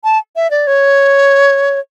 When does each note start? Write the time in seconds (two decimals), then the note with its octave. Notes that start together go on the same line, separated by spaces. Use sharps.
0.04 A5
0.36 E5
0.51 D5
0.67 C#5